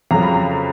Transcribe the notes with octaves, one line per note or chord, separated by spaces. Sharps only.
F2 C#3 F#3 A#5
B5
A#5